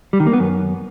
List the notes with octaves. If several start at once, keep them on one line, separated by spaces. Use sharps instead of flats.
G3
D#3
A#3
B3
F#2